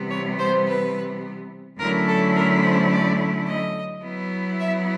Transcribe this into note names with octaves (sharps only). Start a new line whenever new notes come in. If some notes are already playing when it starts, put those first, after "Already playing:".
Already playing: C3 E3 G3 B3
C#5
C5
B4
D3 F#3 A3 C#4 E4 A#4
A4
A#4
C5
D5
D#5
F#3 B3 E4
E5